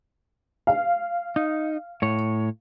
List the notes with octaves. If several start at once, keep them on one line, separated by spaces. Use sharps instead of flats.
F5
D#4
A2 C#5